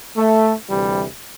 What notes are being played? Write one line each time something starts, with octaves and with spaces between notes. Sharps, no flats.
A3
D2 C3 E3 G3